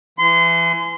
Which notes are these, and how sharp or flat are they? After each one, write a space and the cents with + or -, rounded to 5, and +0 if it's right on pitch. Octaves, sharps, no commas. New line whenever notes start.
E3 +25 C6 -30